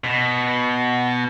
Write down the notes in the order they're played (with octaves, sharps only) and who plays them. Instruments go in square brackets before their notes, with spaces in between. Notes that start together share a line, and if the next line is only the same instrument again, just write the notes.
[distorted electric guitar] B2